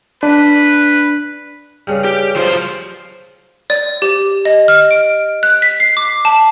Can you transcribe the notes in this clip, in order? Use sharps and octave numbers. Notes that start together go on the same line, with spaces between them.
D4 B4
G2 C#3
G4
F#3 F4 C5
D5
G4
D#5
F6
D7
F#6
B6
C7
D6
A5